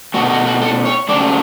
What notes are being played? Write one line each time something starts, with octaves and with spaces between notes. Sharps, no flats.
B2 A3 F#4
F#4
F#4
A4
C#5
C#3 F#3 A3 D5